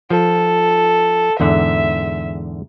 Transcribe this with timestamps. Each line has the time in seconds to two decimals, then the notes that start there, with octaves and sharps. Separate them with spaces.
0.10 F3 A4
1.40 E2 G#2 D3 E5